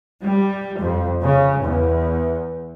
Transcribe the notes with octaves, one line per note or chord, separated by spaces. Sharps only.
G3
F2
C#3
E2